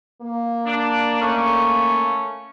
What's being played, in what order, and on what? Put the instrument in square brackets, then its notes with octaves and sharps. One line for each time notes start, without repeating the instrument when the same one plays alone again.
[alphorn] A#3
[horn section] D4
A3 C#4